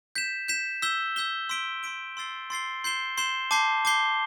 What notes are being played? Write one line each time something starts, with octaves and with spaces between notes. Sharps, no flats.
G6 B6 E7
G6 B6 E7
E6 G6 B6 E7 G7
E6 G6 B6 E7 G7
C6 E6 B6 D7 G7
C6 E6 B6 D7 G7
C6 E6 A6 C7 G7
C6 E6 A6 C7 G7
C6 G6 C7 E7 G7
C6 G6 C7 E7 G7
A5 D6 G6 C7 G7
A5 D6 G6 C7 G7